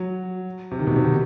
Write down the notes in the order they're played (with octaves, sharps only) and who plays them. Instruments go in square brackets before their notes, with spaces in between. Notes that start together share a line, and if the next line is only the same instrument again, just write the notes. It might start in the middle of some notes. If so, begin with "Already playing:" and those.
Already playing: [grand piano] F#3
C3
D#3
B2
C3
D#3